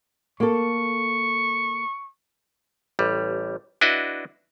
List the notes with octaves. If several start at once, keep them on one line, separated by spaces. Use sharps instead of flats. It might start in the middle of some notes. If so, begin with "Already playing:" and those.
A#3 A4 C#6
A1 G3
D4 E4 F#4 B4 D#5